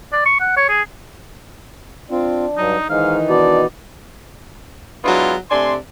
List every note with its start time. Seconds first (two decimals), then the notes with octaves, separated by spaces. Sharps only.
0.13 D5
0.26 C#6
0.40 F#5
0.57 C#5
0.69 G#4
2.11 C4 D4 F4
2.57 G2 F#3 D#4
2.89 G#2 D#3 E3 D#4 F5
3.29 B2 D4 D5
5.04 F#3 G#3 B3 D4 E4 F4
5.51 C3 A3 D4 G#5 C6